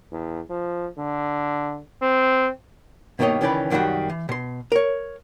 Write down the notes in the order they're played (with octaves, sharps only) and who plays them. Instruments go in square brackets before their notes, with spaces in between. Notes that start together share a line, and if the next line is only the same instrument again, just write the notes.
[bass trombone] E2
F3
D3
C4
[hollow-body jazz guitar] G2 B2 D#3 A#3 C#5 D#5
C#2 D#3 E3 C#4 D5 B5
C2 F#2 D#3 F#3 G3 F#4
E3
B2 C6
A#4 C#5